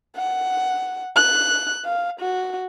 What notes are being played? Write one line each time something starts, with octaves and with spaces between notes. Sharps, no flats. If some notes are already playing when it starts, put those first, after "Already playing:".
F#5
F#6
F5
F#4